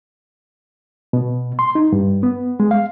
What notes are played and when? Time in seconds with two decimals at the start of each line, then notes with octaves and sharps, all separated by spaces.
1.13 B2
1.59 C6
1.75 D#4
1.92 G2
2.23 B3
2.60 G#3
2.71 F5